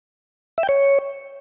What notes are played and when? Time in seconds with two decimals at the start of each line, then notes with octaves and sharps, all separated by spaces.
0.58 E5
0.63 G5
0.69 C#5